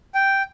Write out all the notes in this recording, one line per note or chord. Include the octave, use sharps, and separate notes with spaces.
G5